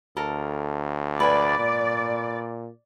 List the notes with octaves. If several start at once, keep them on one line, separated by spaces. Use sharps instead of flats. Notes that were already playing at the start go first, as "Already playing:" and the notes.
D2 A4 A#4
B4 D5 G#5
A#2